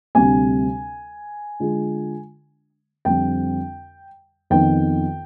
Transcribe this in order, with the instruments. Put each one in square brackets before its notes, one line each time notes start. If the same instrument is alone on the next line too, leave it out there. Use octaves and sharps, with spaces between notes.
[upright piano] D2 C3 G3 C4 G#5
D3 G#3 D4 F4
F2 D3 G3 C4 G5
F2 D#3 B3 G5